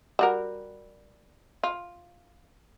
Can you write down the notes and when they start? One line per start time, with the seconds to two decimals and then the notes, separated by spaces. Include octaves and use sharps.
0.19 G3 F#4 A#4
1.63 F4